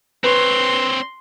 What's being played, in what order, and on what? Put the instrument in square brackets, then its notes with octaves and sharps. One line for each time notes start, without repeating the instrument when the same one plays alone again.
[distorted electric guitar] C4 C#5 [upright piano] B4 [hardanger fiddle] C6